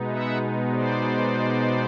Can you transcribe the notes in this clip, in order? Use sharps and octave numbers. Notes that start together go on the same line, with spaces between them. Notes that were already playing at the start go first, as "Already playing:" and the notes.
Already playing: B2 G#3 B3 D#4
E5 F#5
C5 D5